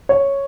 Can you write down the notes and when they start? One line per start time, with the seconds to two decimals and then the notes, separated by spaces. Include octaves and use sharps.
0.09 C#5